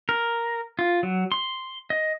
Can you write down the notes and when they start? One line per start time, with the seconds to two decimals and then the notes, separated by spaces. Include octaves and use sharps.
0.09 A#4
0.79 F4
1.03 F#3
1.32 C6
1.90 D#5